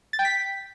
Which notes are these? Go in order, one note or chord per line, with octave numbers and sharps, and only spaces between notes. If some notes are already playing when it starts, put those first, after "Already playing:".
A6
G5
B6